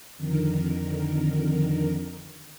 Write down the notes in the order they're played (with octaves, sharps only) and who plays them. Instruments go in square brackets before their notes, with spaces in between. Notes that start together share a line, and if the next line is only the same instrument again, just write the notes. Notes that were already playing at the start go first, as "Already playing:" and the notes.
[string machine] F2 D3 D#3 A#4